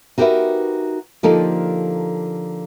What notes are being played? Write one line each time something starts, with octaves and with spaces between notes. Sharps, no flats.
D#4 F#4 G4 A#4 B4 E5
D3 F3 A#3 D#4 G4 A4